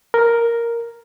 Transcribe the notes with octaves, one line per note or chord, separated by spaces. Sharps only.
A#4